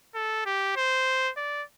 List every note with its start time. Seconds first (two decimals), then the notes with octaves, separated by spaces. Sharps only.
0.15 A4
0.46 G4
0.76 C5
1.37 D5